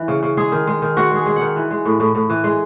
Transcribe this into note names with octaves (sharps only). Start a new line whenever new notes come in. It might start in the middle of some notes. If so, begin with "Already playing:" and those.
Already playing: E3
C#3
C#3
G#3 G#4
D#3
G#3
D#3
G#3 F#4
G#3 G#4
G#3
D#3 F#5
E3
G#3
A2
A2
A2
E3
G#3